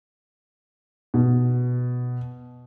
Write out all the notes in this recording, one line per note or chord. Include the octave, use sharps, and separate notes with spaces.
B2